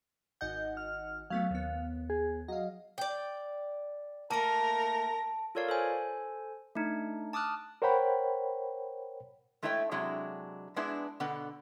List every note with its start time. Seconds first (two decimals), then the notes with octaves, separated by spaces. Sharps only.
0.41 G#1 D#5 F#5 G6
0.77 F6
1.30 F#3 A3 B3 F5
1.51 D#2 B3
2.10 G#4
2.48 F#3 D#5 F5
2.98 D5 G5
4.31 A3 A#3 A#4 A5 A#5 D7
5.55 F4 A4 A#4 C#5 D5 F5
5.69 A4 C5 G#5
6.75 A3 D4 D#4
7.33 A5 D6 D#6 F6 F#6
7.82 A#4 C5 C#5 F#5 G5 B5
9.62 G#3 A3 E4 C#5 F5 G5
9.91 C3 F#3 G#3 D4 E4
10.76 G#3 B3 D4 E4
11.20 B2 D3 B3 F#5